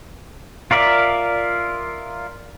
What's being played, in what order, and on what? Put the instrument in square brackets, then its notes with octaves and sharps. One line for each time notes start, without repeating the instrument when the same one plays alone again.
[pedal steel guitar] F4 A#4 D5 E5